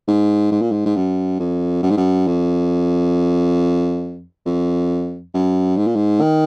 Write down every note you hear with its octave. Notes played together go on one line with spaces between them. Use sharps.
G#2
G#2
A#2
G#2
G#2
F#2
F2
F#2
G#2
F#2
F2
F2
F#2
G#2
A#2
G#2
D#3